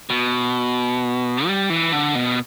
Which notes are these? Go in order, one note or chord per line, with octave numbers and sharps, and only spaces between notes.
B2
G3
E3
D3
B2